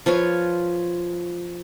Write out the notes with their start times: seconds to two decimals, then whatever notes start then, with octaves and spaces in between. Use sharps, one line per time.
0.06 F3 F4 B4 C#5